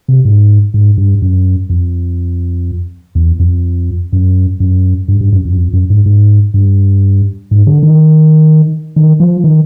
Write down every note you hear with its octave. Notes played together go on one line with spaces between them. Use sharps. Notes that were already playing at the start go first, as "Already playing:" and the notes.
C3
G#2
G#2
G2
F#2
F2
E2
F2
F#2
F#2
G2
G2
F#2
F2
F#2
F2
F#2
G#2
G#2
G2
G#2
D3
D#3
D#3
F3
D#3